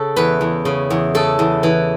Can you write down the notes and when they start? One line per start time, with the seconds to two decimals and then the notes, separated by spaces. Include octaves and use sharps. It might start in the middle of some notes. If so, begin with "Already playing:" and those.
Already playing: C#3 A4
0.16 E2 B4
0.41 E2
0.65 C#3
0.90 E2
1.15 C#3 A4
1.39 E2
1.63 E3